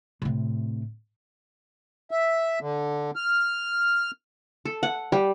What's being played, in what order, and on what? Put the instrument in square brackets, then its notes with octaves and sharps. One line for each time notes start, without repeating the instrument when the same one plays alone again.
[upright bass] A2 C3
[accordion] E5
D3
F6
[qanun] A4
F#5
G3